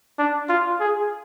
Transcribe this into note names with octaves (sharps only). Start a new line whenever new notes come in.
D4
F4
G#4